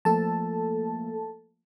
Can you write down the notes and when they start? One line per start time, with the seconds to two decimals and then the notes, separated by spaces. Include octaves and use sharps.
0.05 F3 A3 A#3 A4 A5